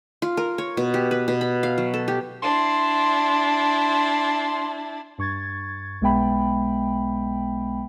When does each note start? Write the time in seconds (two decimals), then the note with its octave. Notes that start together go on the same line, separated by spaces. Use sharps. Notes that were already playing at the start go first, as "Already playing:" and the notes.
0.22 F4
0.37 A#4
0.58 C#5
0.77 B2
0.94 G4
1.11 B4
1.28 B2
1.41 B5
1.63 F5
1.78 F#3
1.94 A4
2.08 G4
2.42 D4 E4 C6
5.18 G2 C#6 G#6 A6
6.01 B1 G#3 B3 E5 G5 B5